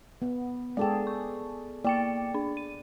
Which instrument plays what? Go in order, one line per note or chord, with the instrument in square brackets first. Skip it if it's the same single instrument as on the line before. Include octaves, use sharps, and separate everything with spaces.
[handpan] B3
[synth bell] G#3 G5 [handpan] G#4 A4 D5
[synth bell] C#6
[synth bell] A#3 G5 C#7 [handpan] D5
[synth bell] D4
D#7